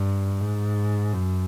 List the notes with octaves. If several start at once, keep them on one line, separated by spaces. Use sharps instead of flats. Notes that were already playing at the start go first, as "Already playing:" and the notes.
Already playing: G2
G#2
F#2